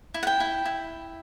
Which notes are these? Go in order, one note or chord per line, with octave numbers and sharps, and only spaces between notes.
E4
F#5
G5
E4
E4